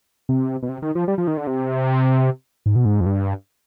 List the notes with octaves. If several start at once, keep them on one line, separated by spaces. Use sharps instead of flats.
C3
B2
C3
D#3
F3
G3
F3
D#3
D3
C3
G#2
B2
G#2
F2
G2